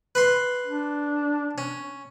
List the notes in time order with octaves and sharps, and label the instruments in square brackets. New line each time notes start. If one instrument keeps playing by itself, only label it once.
[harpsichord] B4 B5 C6
[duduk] D4
[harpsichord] C#4